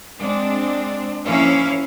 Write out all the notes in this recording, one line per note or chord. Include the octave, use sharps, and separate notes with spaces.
G#3 C4 D4
F3 A#3 C#4 E4 F5